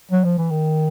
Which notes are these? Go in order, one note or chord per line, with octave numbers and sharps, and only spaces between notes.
F#3
F3
E3
D#3